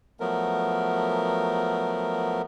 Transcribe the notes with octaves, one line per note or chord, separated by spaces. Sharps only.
F3 F#3 A3 B3 A#4